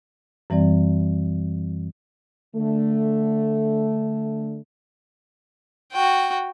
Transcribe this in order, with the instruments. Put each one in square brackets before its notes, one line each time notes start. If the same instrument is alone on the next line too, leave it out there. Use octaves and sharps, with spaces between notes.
[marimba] F#2 E3 G3 C4 D5
[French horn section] D3 A3
[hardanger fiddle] F#4 G5